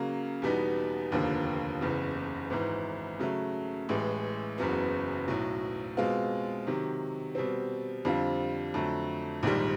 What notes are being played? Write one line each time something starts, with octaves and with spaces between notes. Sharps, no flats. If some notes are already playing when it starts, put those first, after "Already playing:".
Already playing: C#3 F#3 A#3
E2 B2 G3 B3 D#4
F1 D#2 D3 F3 A#3
F#1 E2 C#3
G#1 G#2 E3
C#3 F#3 A3
A1 A2 E3 G#3
F#1 E2 C#3 F#3 B3
B1 A2 F#3
B2 G#3 C4 F4
C3 D#3 F#3
B2 G3 C4
F2 D3 G3 C4 F4
F2 D3 F#3 A3
A#1 G#2 D#3 G3